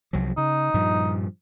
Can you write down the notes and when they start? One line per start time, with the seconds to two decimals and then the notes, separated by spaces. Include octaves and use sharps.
0.13 C2 F3 F#3
0.37 C#3 D#4
0.74 G2 A#2 F3